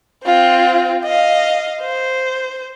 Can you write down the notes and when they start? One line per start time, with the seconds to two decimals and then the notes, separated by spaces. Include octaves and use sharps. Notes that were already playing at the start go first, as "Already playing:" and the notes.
0.25 C4 F4
1.04 D#5 F5
1.82 C5